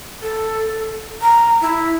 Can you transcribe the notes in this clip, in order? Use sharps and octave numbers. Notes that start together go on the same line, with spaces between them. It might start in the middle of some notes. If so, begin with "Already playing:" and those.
A4
A#5
E4